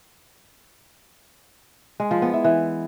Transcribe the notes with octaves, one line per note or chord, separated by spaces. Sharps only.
G#3
F3
B3
E4
E3